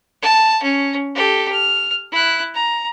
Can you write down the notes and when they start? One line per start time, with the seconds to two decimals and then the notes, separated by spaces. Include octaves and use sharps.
0.22 A5
0.62 C#4
1.15 G4 A4
1.52 F6
2.12 E4 F#6
2.54 A#5